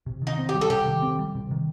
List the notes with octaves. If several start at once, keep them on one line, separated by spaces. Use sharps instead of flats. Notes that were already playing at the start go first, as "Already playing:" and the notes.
C3
D#3
D#4
C4
G4
G3
A4
C3 G4
D#3
C4
G3
C3
D#3